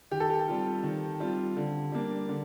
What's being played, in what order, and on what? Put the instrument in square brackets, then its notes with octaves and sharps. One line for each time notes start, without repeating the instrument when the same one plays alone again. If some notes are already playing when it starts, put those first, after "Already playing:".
[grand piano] D#3 [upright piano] G4
[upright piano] A4
G4
[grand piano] G3 C4 F4
D#3
G3 C4 F4
D3
G3 A#3 D4
D3